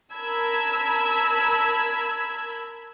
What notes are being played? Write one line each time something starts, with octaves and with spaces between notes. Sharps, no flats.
A#4 A5 B5 E6 G#6